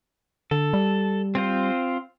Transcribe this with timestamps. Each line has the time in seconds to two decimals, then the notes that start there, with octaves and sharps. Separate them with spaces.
0.51 D3 A4
0.73 G3
1.35 C4 F4 C5